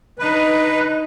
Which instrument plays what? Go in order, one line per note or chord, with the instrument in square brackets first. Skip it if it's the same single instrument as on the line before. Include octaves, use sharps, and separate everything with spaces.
[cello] D3 D#4 [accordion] B4